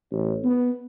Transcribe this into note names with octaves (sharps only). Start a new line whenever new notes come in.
A1
B3